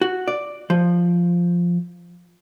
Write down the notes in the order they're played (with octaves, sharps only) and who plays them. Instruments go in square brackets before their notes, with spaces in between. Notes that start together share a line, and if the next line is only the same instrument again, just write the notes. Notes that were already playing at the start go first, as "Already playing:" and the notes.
[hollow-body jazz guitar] F#4
D5
F3